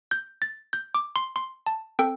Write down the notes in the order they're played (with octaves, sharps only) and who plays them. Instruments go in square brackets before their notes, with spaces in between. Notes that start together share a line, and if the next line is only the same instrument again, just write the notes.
[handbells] G6
A6
G6
D6
C6
C6
A5
C4 A4 G5